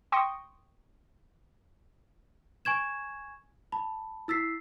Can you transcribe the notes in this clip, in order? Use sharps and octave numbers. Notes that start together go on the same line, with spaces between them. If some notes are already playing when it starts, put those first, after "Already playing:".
G5 C6 C#6 D#6 A#6 C#7
G#5 C#6 G#6 E7
A5 B5
E4 E6 A6 B6 C7